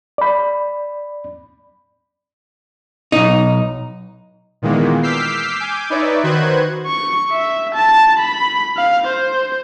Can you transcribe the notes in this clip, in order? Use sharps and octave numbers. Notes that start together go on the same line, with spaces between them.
D5 B5
B1 D#4
A#2 D#3 E3 G#3 A#3 B3
D6 E6 F6 G6 B6 C7
G#5 D6 G6
D#4 B4 C#5 D5 E5
D#3 F#4 B4 C5 F#6 G#6
C#6
E5
A5
B5
F5
C5